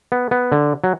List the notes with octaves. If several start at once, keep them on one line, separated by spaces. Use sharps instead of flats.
B3
B3
D3
F#3